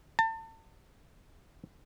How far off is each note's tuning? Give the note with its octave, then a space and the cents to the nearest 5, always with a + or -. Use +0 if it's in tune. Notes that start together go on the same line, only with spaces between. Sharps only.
A5 +35